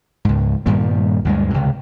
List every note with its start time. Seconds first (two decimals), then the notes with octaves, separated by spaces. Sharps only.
0.25 C#2 G#2
0.66 G2 A#2 D#3 G3
1.25 D2 G2 G#3
1.50 C#2 C3